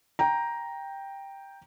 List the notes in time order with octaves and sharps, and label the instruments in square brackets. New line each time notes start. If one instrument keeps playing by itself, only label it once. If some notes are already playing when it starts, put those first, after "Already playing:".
[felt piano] G5 A#5